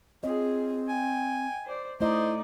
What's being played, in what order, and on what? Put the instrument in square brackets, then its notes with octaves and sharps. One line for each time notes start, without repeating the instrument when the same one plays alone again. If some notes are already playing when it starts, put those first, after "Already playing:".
[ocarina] C4 [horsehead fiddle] F4 G#4 [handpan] C#5 D#5
[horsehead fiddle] G5 [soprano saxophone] G#5
[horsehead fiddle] C5 D5
[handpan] A3 D#5 [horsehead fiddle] D#4 D5 [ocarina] E4 [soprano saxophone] C5